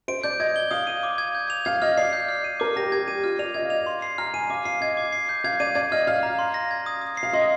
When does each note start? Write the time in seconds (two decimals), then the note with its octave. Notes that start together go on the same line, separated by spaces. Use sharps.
0.08 C5 D7
0.24 D5 G6
0.40 D#5 G#6
0.56 G7
0.71 F5 D#6
0.87 D#7
1.03 D6
1.18 G#6
1.35 G6
1.50 F7
1.65 F5 G#6
1.82 D#5 F6
1.98 D5 C7
2.13 G6
2.29 F6
2.44 D#7
2.60 A#4 D6
2.76 G4 A#6
2.92 G4 G#6
3.08 G4 D#7
3.24 F4 F6
3.39 D5 F7
3.54 D#5 G#6
3.63 F5
3.70 D#5 F7
3.86 C6
4.02 C7
4.18 A#5 F6
4.34 G#5 D#7
4.50 F5 D6
4.65 F5 C7
4.81 D#5 G#6
4.97 D6
5.13 C7
5.29 G6
5.44 F5 G#6
5.60 D5 D#7
5.75 D5 G#6
5.92 D#5 F6
6.07 F5 F6
6.23 A#5
6.39 C6
6.54 A#6
6.71 G#6
6.86 D#6
7.01 D#6
7.17 C7
7.23 F5
7.33 D#5 C6